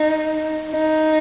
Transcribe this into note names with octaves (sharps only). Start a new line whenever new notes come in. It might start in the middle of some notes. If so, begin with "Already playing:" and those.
Already playing: D#4
D#4